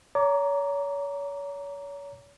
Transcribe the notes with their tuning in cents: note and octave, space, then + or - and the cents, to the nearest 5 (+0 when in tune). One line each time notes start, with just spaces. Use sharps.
C#5 +35 A#5 +0 D6 -15